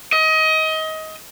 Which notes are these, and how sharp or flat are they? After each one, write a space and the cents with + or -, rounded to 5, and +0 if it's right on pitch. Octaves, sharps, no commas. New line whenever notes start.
D#5 +25